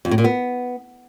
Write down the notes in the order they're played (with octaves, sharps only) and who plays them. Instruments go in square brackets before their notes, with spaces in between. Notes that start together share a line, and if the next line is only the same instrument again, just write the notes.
[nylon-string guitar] F2
A2
A#2
B3